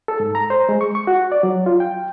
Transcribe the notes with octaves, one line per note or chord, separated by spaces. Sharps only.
A4
G#2
A#5
C5
G#3
C#6
C#6
F#4
D5
F#3
F4
G5